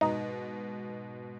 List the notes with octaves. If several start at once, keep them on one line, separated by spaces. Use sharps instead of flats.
G#2 B2 D#4